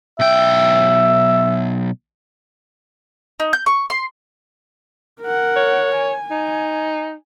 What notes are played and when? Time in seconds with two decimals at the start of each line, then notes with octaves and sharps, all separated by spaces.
0.20 B1 E5 G5
3.40 D#4
3.53 G6
3.66 C#6
3.90 C6
5.21 A#4 F#5
5.56 C#5
5.95 G#5
6.31 D#4